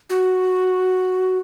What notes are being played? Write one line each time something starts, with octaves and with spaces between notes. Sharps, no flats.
F#4